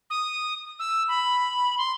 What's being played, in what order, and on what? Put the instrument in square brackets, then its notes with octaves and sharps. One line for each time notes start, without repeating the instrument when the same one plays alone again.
[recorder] D#6
E6
B5
C6